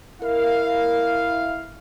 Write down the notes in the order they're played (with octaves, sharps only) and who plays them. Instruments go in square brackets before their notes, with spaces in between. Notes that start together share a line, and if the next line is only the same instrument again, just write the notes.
[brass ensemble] E4 F5 [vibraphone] A#4